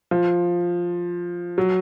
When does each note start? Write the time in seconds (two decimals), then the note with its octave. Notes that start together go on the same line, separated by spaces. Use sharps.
0.11 F3
1.58 F#3